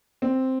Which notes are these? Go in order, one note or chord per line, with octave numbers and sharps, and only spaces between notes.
C4